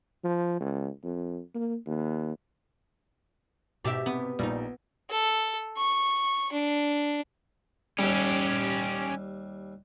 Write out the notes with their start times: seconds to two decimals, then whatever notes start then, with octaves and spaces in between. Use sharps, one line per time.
0.24 F3
0.60 C#2
1.04 F2
1.55 A#3
1.87 D#2
3.84 G#2 B2 G4 D5 E5
4.06 C3 B3
4.39 A#1 G3 D#4
5.10 A4
5.77 C#6
6.52 D4
7.99 D#2 G3 C#4 G4